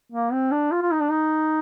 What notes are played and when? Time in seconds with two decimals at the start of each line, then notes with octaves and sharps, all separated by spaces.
0.12 A#3
0.32 C4
0.52 D4
0.71 F4
0.82 F4
0.91 D#4
1.01 D4
1.11 D#4